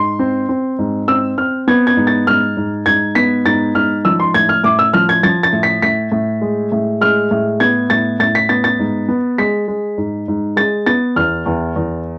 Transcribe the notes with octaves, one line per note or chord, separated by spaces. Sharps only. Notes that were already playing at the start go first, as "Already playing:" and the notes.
Already playing: G#2 C6
C4
C4
G#2
C4 E6
C4 F6
B3 G#6
G#6
G#2
A6
G#2 F6
G#2
G#2 G#6
B3 B6
G#2 A6
G#2 F6
F3 E6
C6
A2 G#6
F6
A2 D6
E6
F3 F6
G#6
F3 A6
A6
A2
B6
A2 B6
A2
G#3
A2
G#3 F6
A2
B3 G#6
A2 A6
A2 A6
B6
B3 A6
A6
G#2
B3
G#3 B6
G#3
G#2
G#2
G#3 A6
B3 A6
E2 F6
E2
E2